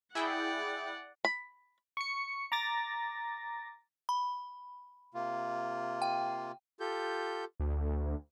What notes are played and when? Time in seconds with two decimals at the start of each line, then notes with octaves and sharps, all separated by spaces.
0.15 E4 G#4 D5 F#5 G5
1.25 B5
1.97 C#6 C#7
2.52 A#5 D6 A6 A#6
4.09 B5
5.14 C3 A#3 F4
6.02 G5
6.80 F4 G4 A4 G6
7.60 D2